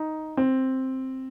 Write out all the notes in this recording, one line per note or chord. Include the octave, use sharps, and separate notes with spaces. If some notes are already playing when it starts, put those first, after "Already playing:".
Already playing: D#4
C4